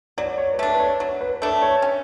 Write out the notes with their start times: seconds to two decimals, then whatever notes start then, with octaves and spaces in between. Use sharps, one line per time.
0.18 F#3 D5
0.38 C#5
0.54 B4
0.59 A3 D4 A4
0.75 B4
0.80 C#5
1.00 F#3 C#5
1.21 B4
1.36 B4
1.42 A3 D4 A4
1.62 C#5
1.82 C#4